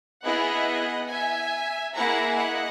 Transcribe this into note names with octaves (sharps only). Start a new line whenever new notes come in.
B3 E4 G#4 D#5 F#5
E5 G#5
A#3 E4 G#4 F#5 A#5
D#5 F#5